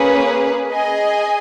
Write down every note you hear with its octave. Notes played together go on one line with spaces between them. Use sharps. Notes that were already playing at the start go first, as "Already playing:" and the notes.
Already playing: A#3 C#4 G#4 B4
G#4 D#5 G#5